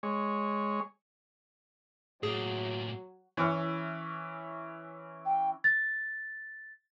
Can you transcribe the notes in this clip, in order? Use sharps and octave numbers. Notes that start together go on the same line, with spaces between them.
G#3 C#5
A2 F#3 A#3 G#4
E3 C#4 E4 C#5
G5
A6